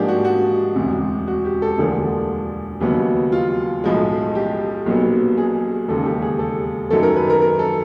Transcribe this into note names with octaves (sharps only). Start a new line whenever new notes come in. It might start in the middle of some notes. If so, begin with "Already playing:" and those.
Already playing: G#2 F3 A#3 D4 G4 G#4
F#4
F#4
E1 D2 C3
F#4
G4
A4
E1 D2 D3 F3 A#3 G#4
F1 D#2 C#3 F#3 B3 G4
F4
B1 A2 F3 G#3
G4
B1 A#2 F#3 B3
G#4
E1 D#2 C#3 A4
G4
G#4
A4
F#2 D#3 F#3 A3 A4
A#4
B4
A#4
A#4
A4